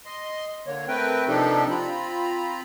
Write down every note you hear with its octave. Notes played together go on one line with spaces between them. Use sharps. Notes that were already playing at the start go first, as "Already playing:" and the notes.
D#5 C6
D3 A#3 C#5
A3 C4 A#4 B4 G5
C3 F3 D4 D#4 G4 A4
C4 F4 A#5 B5